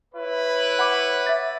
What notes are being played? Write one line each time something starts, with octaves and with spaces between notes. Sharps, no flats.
E4 B4 C#5
F#5 B5 D6
E5 A6